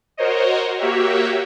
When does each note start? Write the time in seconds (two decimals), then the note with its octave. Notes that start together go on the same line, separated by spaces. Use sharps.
0.17 F#4 A#4 C5 C#5 D#5
0.78 A#3 F#4 G4 C#5 E5